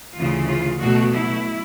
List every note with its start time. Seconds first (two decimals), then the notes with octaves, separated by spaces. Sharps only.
0.16 D2 C#3 E3 F4
0.48 F4
0.81 B2 F#3 A3 F#4
1.14 E4